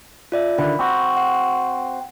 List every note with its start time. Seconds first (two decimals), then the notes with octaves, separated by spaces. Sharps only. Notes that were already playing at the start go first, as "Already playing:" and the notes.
0.32 F4 D5 E5
0.58 D3 D#3 B5
0.79 C4 F#4
1.17 F#5